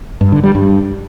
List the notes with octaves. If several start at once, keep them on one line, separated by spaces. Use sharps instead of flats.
G2
D3
G3
G2